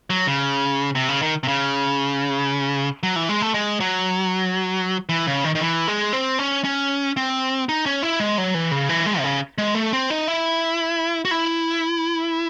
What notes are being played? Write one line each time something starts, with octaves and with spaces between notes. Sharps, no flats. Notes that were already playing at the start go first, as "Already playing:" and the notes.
F#3
C#3
C3
C#3
D#3
C3
C#3
F#3
E3
G#3
A3
G#3
F#3
E3
C#3
D#3
D#3
E3
G#3
C4
C#4
C#4
C4
D#4
C#4
E4
G#3
F#3
E3
C#3
E3
G#3
C3
C#3
G#3
A3
C4
D#4
E4
F#4
E4